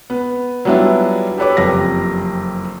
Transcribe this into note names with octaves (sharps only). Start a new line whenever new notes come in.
B3
F#3 G3 B3 D4 E4 F4
G4 A4 B4 C#5 D6
F#1 F2 G4 A#6